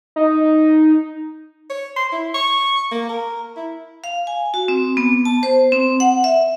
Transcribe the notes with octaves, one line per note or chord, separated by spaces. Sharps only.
D#4
C#5
C6
E4
C#6
A#3
A#4
E4
F5
G#5
F#4
C4
B3
A5
C5
C4
F#5
E5